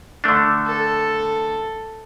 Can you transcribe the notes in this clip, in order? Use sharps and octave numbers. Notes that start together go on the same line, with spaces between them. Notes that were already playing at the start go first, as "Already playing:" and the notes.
D3 A3 D4
A4